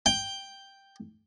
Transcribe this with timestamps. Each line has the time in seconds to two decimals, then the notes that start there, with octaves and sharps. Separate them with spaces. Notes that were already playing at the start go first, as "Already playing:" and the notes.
0.06 G5